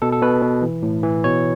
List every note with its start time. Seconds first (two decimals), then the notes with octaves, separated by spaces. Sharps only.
0.02 B2 A4
0.13 A4
0.22 B2 B4
0.42 B2
0.62 E3
0.83 A2
1.03 E3
1.24 B2 C#5